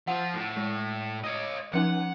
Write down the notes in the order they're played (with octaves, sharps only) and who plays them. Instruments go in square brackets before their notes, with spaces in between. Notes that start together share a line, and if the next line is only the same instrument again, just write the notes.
[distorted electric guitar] F3 [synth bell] F#5
[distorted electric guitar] A2
[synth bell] G#3
[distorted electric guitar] C#5 D#5
[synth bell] F3 C#4 D#4 [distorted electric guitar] F#5